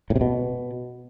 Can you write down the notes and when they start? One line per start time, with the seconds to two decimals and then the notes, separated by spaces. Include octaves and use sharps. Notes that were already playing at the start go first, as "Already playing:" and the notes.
0.10 A2
0.16 C3
0.21 B2